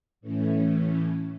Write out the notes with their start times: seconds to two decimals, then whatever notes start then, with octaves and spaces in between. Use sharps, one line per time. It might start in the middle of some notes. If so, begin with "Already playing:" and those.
0.21 A2 E3 A3 C#4